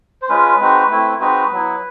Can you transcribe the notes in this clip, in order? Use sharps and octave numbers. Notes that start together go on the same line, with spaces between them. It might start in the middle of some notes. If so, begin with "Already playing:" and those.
C5
G#3 C#4 F4 B4
G#3 C4 D#4 F#4
A3 C4 E4
G#3 C4 D#4 F#4 B4
F#3 B3 E4